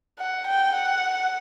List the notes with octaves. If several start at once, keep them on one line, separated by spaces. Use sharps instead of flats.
F#5
G5
F#5